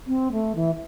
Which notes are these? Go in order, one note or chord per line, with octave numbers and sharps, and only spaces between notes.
C4
A3
E3